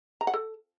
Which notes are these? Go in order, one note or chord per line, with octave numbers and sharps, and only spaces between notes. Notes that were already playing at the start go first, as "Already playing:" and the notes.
A#5
F#5
A4